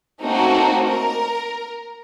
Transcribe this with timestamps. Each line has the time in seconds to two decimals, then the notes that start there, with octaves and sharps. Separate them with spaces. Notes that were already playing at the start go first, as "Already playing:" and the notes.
0.22 A3 A#3 C4 C#4 D#4 F#4
0.83 A#4